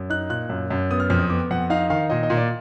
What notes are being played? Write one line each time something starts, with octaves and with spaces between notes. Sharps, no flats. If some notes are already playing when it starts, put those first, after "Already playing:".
Already playing: F#2
D#4 F#6
A#2 F#6
F#2
F#2
B3 D#6
F6
F2 F6
D#6
B3 D6
F2 F#5
D#4 F5
D#3 F5
A#2 D#5
D#5
A#2
D5